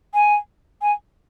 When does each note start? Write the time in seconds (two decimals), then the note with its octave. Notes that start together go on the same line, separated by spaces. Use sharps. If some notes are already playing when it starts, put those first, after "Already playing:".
0.14 G#5
0.81 G#5